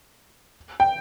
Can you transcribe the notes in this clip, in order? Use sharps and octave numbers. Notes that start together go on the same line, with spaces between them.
G5